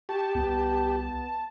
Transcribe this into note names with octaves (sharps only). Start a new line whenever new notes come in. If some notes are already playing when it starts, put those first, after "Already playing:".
G4 A5 C#6
C2 B3